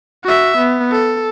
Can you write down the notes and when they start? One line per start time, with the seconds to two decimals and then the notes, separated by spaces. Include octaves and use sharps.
0.24 F#4 E5
0.57 B3
0.91 A4